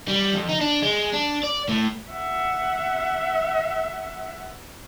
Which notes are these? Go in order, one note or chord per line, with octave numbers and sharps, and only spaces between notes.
G3
F2
D#4
D4
G#3
D4
D5
A2
E5 F#5